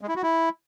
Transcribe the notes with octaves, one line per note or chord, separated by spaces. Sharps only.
G#3
E4
F#4
E4